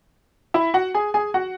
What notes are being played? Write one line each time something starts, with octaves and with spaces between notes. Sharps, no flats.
E4 E5
F#4 F#5
G#4 G#5
G#4 G#5
F#4 F#5